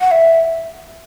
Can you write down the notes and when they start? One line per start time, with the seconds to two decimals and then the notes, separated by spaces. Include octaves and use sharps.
0.01 F#5
0.11 E5